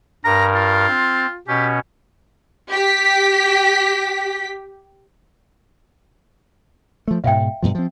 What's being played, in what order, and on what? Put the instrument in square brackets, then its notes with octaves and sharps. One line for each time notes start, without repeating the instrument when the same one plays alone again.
[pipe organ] G2 A#4 [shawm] A#5
[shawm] F4
[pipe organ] C4
[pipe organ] B2 C#4 [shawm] G4
[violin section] G4 B6
[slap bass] F3 A3
[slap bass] G#2 B2 [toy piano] E5 F5 G5
[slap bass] G2 B2 F3
F3 C4